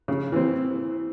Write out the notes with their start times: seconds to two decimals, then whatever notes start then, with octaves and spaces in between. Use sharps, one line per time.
0.08 C#3
0.32 E3 C4